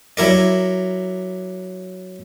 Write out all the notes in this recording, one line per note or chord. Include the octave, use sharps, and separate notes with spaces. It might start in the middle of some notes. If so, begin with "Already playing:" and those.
F#3 E4 A#4 D5